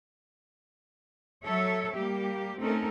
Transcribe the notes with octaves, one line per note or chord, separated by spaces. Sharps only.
F#3 A4 C#5 E5
G3 A#3 G4
A3 C4 C#4 D#4 A4 A#4